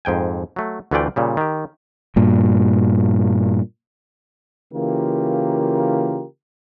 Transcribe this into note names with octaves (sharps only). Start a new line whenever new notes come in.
F2 G#2 G5 G#5
F#3 A3
D2 E3 A3 F4 D5 G5
A#2 C#3 G3
D#3 G4
G2 A#2
C#3 E3 A#3 F4 G4 A#4